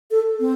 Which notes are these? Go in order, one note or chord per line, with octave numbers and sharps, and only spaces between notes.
A4
C4